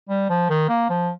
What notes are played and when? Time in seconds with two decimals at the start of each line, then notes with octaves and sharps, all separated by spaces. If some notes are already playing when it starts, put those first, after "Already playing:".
0.09 G3
0.30 F3
0.50 D#3
0.69 A#3
0.90 F3